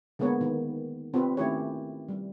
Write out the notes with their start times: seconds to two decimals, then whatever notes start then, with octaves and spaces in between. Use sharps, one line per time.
0.19 D3 G#3 A#3 B3 B4 C#5
0.41 D#3
1.14 C4 F4 G4 B4
1.37 D#3 A3 C#4 E4 G4 C#5
2.09 G3